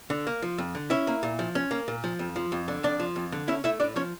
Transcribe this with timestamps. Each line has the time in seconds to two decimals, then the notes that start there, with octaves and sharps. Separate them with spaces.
0.10 D3
0.27 A#3
0.42 F3
0.58 F2
0.75 D3
0.90 C#4 E4 E5
1.07 A#3
1.23 A#2
1.39 F3
1.55 C#4
1.71 A#3
1.88 A#2
2.04 F3
2.19 F2
2.36 F3
2.52 F2
2.68 D3
2.83 F2 D4 D5
3.00 F3
3.16 F2
3.32 D3
3.48 C#4 E4 E5
3.64 A3 E4 E5
3.80 A2 D4 D5
3.96 F3 C#4 C#5